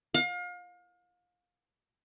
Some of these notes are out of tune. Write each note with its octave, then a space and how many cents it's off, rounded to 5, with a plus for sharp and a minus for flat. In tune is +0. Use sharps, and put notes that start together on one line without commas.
F5 +35